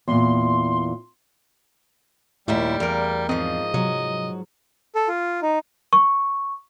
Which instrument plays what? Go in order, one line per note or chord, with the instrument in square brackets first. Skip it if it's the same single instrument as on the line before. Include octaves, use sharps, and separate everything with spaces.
[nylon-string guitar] E2 A#2 [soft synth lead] C6
[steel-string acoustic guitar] D#2 A#2 E4 [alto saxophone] G3 [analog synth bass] A3
[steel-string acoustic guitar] E2 [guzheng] A#3 A#4
[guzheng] G#2 F3 [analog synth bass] C4 [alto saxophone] D#5
[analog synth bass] C3 [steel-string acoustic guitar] F#3
[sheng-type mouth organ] A4
F4
D#4
[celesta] C#6